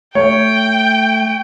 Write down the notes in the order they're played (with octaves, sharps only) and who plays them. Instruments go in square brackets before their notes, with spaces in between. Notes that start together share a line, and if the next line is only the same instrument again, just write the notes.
[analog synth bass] A3 [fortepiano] C#5 [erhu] G5